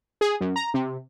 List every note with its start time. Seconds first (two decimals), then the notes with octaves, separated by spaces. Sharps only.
0.21 G#4
0.41 F#2
0.56 A#5
0.74 C3